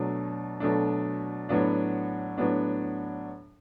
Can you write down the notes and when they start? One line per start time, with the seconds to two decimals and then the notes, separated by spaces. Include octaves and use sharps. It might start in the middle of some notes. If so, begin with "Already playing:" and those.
Already playing: B2 F#3 A3 D4
0.60 B2 F#3 A3 D4
1.49 A2 F#3 B3 D4
2.38 A2 F#3 B3 D4